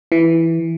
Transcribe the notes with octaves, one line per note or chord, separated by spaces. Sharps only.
E3